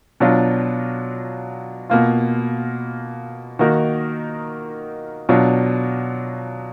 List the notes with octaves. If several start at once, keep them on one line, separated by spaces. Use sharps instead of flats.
B2 F#3 D4 F4
B2 A#3 F4
D#3 A#3 D#4 F#4 A#4
B2 F#3 D4 F4